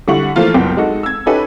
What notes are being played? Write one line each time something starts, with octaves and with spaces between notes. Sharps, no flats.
D3 G3 E4 F#5 C#6 F#7
E3 F3 A3 A#3 F4
F#1 C2 B3 G5
G#3 D#4 F#4 A4
E6 G#6
C#4 D#4 G4 A4 B4 G#5